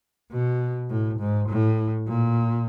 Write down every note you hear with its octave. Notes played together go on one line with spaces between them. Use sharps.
B2
A2
G#2
A2
A#2